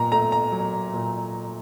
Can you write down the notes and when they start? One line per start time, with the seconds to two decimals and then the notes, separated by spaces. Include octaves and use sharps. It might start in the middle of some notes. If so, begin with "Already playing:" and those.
Already playing: A#2 A#5
0.12 A3 A#5
0.32 A#5
0.52 F#3
0.93 A#2